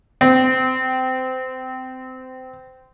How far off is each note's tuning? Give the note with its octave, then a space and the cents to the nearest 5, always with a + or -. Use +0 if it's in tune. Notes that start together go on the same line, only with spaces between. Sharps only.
C4 -20